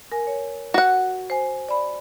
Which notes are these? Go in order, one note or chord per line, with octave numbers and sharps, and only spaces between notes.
A#4 G#5
C#5
F#4 F#5
C5 G#5
D5 B5